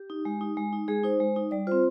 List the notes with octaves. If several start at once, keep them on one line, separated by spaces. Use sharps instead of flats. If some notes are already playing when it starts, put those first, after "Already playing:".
Already playing: G4
D#4
G#3
D#4
G#3
D#4
G#3 G#4
D#4 C5
G#3
D#4
G3 D5
C4 F4 C5